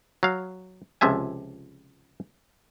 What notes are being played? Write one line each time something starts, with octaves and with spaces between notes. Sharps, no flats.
F#3 F5
C#2 C3 F3 E5 G#5